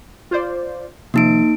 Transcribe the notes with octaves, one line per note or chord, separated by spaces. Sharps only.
F4 C5 D5
C3 D#3 F3 A#3 D#4 D7